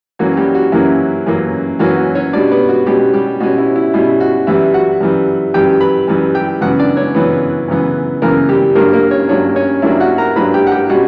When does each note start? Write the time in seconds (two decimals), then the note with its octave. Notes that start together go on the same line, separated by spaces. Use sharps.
0.19 F#2 E3 A#3 C#4 F#4
0.37 G3 G4
0.55 F#4
0.72 F#2 E3 A#3 C#4 E4
1.26 F#2 E3 A#3 C#4
1.79 F#2 E3 A#3 C#4 F#4
1.97 F#4
2.15 C#4 C#5
2.33 B2 G3 C#4 D4 D5
2.51 B3 B4
2.69 F#4
2.87 B2 G3 C#4 G4
3.14 G3 G4
3.40 B2 G3 C#4 F#4
3.58 E4
3.76 E4
3.94 B2 G3 C#4 E4
4.20 F#4
4.47 F#2 E3 G3 E4 E5
4.74 F#4 F#5
5.01 F#2 E3 G3
5.54 F#2 E3 G3 G4 G5
5.80 B4 B5
6.08 F#2 E3 G3
6.35 G4 G5
6.61 F#2 C#3 E3 B3 F#4 F#5
6.79 D4 D5
6.97 C#4 C#5
7.15 F#2 C#3 E3 B3 B4
7.68 F#2 C#3 E3 B3
8.22 F#2 C#3 E3 A#3 B3 A#4
8.49 G3 G4
8.75 G2 F#3 A#3 D4 A#4
8.93 A#3 A#4
9.11 C#4 C#5
9.29 G2 F#3 A#3 C#4 D4 C#5
9.56 C#4 C#5
9.82 G2 F#3 A#3 D4 E4 E5
10.00 F#4 F#5
10.18 A#4 A#5
10.36 G2 F#3 A#3 D4 B4 B5
10.54 G4 G5
10.67 F#5
10.72 G4 G5
10.89 B2 G3 C#4 F#4 F#5